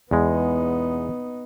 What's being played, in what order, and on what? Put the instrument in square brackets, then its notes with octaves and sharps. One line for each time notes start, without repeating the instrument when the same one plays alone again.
[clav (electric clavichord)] E2 G#3 [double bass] B3 D#4